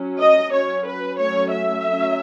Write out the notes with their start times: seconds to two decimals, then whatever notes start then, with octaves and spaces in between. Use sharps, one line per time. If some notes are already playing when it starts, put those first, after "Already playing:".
Already playing: F#3 C#4
0.21 D#5
0.53 F#3 C#4 C#5
0.86 B4
1.19 F#3 A3 C#4 C#5
1.53 E5
1.86 F#3 A3 C#4